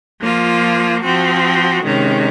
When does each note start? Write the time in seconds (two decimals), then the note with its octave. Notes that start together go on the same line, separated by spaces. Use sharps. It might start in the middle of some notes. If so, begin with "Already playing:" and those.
0.21 F3 A#3 F4
1.02 F3 C4 F#4
1.82 C3 D#3 G#3 C#4